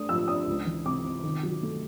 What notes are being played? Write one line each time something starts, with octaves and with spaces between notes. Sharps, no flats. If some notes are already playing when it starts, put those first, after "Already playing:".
Already playing: A3 D4 D#6
F3 E6
D4 D#6
C#2
E3
C3 D6
C3
D#3
F#3
A3